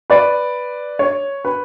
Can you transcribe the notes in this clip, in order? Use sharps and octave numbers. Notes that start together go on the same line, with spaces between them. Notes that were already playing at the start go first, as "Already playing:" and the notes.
B4 D5
C#5
B4